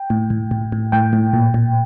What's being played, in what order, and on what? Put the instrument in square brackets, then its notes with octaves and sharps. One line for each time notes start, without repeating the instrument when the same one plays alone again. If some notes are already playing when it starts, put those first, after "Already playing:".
Already playing: [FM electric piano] G5
A2
A2
A2
A2
A2 G5
A2
A#2
A#2